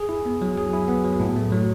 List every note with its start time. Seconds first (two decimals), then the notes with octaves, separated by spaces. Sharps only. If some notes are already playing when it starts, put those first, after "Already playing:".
Already playing: G#4
0.09 E4
0.26 B3
0.42 F#3
0.58 G#4
0.73 E4
0.88 B3
1.04 F#3
1.20 A2
1.36 A3
1.52 F#3